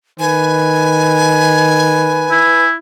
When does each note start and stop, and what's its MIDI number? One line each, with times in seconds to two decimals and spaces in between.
0.20 2.51 51
0.20 2.66 71
0.20 2.69 80
2.31 2.74 64